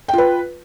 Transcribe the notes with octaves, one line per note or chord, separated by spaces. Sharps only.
F4 B4 G5